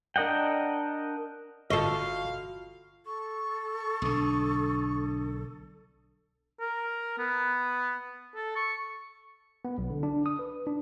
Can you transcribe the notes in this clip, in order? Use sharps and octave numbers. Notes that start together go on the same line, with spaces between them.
D4 A#4 D#5 F#5 G5
G1 F4 F#4 A4 D#5 F5 C#6 C7
A4 C#6
B1 D3 D4 D#6
A#4
B3
A4
C#6
B3
B1
D3
D4
D#6
B4
D4